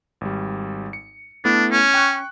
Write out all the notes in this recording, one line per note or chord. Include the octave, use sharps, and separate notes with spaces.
G#1 G3
C#7
A3 B3 D4 E4
C#4
G5 C#6 F#6